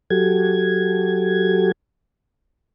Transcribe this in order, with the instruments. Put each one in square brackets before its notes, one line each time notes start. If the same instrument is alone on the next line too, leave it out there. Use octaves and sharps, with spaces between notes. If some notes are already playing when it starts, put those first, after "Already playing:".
[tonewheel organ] F#3 F#4 G4 A4 G#6